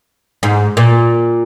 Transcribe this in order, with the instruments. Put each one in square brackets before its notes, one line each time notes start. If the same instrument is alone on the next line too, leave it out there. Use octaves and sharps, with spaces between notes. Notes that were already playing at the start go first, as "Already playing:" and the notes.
[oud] G#2
A#2